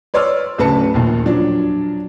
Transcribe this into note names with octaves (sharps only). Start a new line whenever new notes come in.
B4 C#5 D5 C6 E6 F6
D1 C#3 B4 A5 C#7
A#1 D#2 A#2
F3 F#3 D4